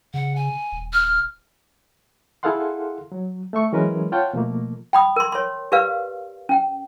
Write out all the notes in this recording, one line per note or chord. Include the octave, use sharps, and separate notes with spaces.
C#3 F#5
G#5
D#1
F6
E4 G#4 A4 F5 F#5 C6
F#3
A3 E5 C#6
E3 F#3 G#3 C#4 A#4 B4
F4 C#5 F#5 G5 A5
B2 F3 A3 A#3
G5 B5 D#6
A#4 C6
C#5 C6
G4 A#4 B4 D5 F5
C#4 G5